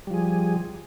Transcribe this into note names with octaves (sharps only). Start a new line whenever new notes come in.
F3 G3 G#4